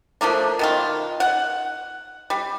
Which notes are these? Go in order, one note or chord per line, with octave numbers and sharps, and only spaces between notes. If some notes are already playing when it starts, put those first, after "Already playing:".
F3 A3 A#3 D4
B2 D#3 F4
F#5
G3